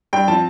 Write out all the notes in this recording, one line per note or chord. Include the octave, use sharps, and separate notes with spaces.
G2 G5
F3 C4 A5